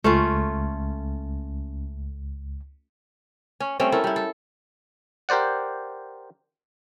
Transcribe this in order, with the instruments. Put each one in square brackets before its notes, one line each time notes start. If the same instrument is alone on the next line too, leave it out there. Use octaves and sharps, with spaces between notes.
[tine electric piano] C#2 [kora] A3 C#4 F4
[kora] C#4
G3 A3 C4 C#4
C#4 E4 A4 A#4
G3 E4
A4
[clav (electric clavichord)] G4 A#4 C5 D5 F#5